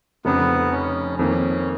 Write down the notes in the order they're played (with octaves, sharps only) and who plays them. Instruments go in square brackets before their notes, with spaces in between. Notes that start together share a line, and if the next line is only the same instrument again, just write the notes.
[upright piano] F1 F2 C#3 [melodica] B3
[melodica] C#4
[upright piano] F2 D#3 A#3 [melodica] C#4